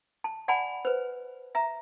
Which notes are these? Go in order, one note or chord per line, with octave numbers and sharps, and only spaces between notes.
A5
D5 F#5 G#5 A5 B5
B4 C5
E5 A#5